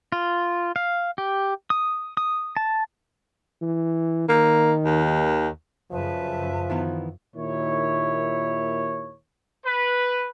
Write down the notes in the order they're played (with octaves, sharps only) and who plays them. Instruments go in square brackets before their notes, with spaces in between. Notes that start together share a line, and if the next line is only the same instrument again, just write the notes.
[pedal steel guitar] F4
F5
G4
D#6
D#6
A5
[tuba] E3
[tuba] D#3 [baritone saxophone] A#3
[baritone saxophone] D#2
[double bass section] F#2 C#3 [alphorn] F3 [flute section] B4 E5 A5
[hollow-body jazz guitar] D#3 E3 B3
[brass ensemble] D#2 A#2 D#3 E4 C#5
[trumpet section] B4